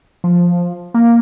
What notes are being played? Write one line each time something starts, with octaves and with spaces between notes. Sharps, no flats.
F3
A#3